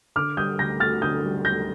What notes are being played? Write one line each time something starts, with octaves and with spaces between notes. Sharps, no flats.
D3 D6 F6
G3 D#6 G6
D2 G6 A#6
D2 F6 A6
D3 D#6 G6
G3
D2 G6 A#6